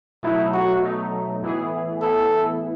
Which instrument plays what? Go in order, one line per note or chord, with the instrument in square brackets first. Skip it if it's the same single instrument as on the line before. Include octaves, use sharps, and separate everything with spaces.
[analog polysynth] B2 F#3 A3 D#4 [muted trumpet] E4
[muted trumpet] F#4
[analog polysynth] B2 F#3 A3 D#4
A2 E3 B3 E4 G#4
[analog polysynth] A2 E3 B3 E4 G#4 [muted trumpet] A4